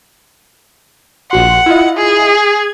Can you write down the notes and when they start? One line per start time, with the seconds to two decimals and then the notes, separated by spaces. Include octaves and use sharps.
1.31 A#1 F#4 F#5 C6
1.66 E4 F4 D#5
1.97 G#4
2.37 G#6